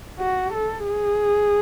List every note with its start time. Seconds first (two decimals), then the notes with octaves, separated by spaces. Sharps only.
0.19 F#4
0.53 A4
0.87 G#4